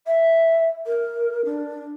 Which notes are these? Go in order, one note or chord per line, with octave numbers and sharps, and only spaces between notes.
E5
A#4
D4